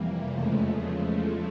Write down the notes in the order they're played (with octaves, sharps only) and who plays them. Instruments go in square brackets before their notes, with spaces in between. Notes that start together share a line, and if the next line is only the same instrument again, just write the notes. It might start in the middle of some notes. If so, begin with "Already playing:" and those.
Already playing: [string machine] F2 C3 E3 G3 A#3
E2 C#3 F3 G#3 A3